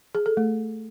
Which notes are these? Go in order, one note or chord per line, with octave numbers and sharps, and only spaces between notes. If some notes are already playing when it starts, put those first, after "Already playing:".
G#4
A4
A3